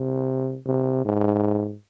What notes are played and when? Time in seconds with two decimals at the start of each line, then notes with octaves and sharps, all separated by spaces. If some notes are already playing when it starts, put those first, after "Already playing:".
Already playing: C3
0.66 C3
1.05 G#2